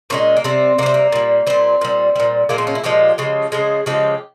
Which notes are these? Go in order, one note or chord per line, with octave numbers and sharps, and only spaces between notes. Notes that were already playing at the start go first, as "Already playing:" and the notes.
A#2 F3 G#3 C#4
A#3
C3 G3 C4
C3 G3 A#3 C4
A#3
A#2 G3
A#2 G3 C4
A#2 G3
A#2 G3
A#2 F3 G#3 A#3
C4
C#4
E4
A#2 F3 G#3 G4
C#3 F3 G#3
C#3 F3 G#3 G#4
C#3 F3 G#3 G4